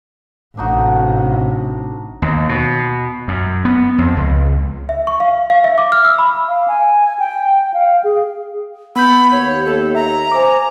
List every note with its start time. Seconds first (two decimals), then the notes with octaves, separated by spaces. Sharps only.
0.57 A1 C3 D4 D#4 F#4
2.22 D#2
2.49 B2
3.28 F#2
3.65 B3
3.98 F2
4.17 C#2
4.89 E5
5.07 C#6
5.20 F5
5.50 F5
5.64 E5
5.78 D6
5.92 F6
6.05 E6
6.19 B5
6.49 F5
6.68 G#5
7.19 G5
7.74 F5
8.04 G#4
8.96 B3 B5 G6
9.32 D#2 C#5
9.66 A4
9.95 E5 A#5
10.32 C5 G#5 D6